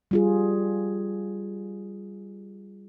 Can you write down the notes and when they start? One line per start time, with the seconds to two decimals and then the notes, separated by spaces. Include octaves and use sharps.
0.11 G3 F4 G#4